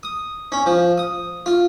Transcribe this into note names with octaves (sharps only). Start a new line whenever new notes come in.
D#6
C#4
F3
D#6
F4